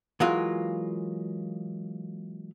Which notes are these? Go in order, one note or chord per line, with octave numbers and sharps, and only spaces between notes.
E3 F#3 G#3 A#3 F4